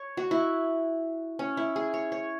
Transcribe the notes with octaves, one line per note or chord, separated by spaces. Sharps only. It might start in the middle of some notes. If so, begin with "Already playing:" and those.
Already playing: C#5
F#4
E4
C#4
E4
G#4
C#5
C#5